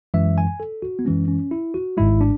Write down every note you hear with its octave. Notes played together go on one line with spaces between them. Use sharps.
F#2 E3 G#3 E5
G#5
A4
F#4
B3
F#2 E3 G#3 C#4
C#4
E4
F#4
G#1 G#2 G#3 E4
D4